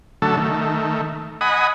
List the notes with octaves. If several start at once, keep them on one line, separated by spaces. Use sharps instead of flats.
D3 F#3 A3 A4
D#3 A3
D#5 F#5 G#5 B5 D#6